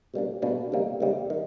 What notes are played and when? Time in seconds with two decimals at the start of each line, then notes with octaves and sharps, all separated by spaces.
0.14 B2 G3 A#3 D4
0.42 B2 G3 A#3 D4
0.72 C#2 C3 D#3 G3 A#3
1.00 C#2 C3 D#3 G3 A#3
1.30 D#3